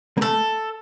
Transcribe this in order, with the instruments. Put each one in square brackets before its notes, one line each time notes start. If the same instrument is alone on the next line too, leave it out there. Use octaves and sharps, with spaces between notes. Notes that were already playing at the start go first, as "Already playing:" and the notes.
[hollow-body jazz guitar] A#3
[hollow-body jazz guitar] A3 [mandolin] A4